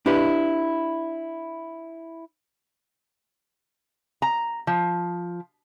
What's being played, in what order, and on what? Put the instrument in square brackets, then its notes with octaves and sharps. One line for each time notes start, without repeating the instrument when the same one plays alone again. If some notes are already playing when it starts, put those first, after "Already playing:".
[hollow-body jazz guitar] D4 E4 G4 B4
[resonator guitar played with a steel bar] A#5
F3